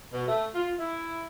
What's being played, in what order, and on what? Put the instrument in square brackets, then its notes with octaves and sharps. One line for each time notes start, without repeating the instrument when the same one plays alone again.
[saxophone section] B2
A3
F4
E4